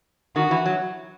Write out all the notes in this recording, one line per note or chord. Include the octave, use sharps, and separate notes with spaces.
D#3 F#4
E3
F#3